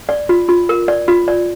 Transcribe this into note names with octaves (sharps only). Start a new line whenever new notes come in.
D5
F4
F4
A#4
D5
F4
D5